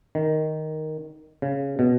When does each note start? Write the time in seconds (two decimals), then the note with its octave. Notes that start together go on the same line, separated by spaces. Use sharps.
0.15 D#3
1.42 C#3
1.79 B2